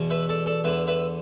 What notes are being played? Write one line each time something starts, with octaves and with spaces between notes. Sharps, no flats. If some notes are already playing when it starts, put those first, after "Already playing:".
Already playing: E2 B2
B4 E5
A4 D5
A4 D5
E2 D3 B4 E5
B4 E5